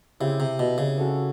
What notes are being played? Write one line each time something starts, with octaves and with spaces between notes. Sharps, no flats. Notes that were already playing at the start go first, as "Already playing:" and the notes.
C#3 C4 E4 G4
C3
B2
C#3
C#4 F#4 A4 C#5